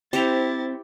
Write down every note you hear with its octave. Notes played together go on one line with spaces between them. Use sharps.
C4 E4 G4 C5 A#5 A6 B6 C#7